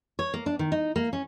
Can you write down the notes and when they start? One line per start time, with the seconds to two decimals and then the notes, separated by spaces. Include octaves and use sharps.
0.19 C#5
0.34 A#3
0.46 D4
0.59 D#3
0.72 D#4
0.96 A#3
1.13 C#4